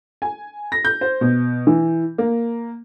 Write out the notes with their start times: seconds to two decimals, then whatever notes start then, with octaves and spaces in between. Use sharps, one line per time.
0.22 G#5
0.72 A#6
0.85 G6
1.01 C5
1.21 B2
1.67 E3
2.18 A#3